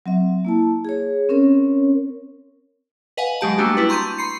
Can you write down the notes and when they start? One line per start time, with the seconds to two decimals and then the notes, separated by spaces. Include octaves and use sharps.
0.06 F#3 C4 E5
0.45 A#3 E4 A5
0.85 G#4 C#5
1.29 C4 C#4 A#4 C#5
3.17 B4 D#5 F5 F#5 G#5
3.41 F#3 G#3 G4 A5
3.58 G3 A3 A#3 D4 F#4 G4
3.77 D4 E4 B4
3.89 A#5 C6 C#6 G6 D#7
4.18 B5 C6 C7 C#7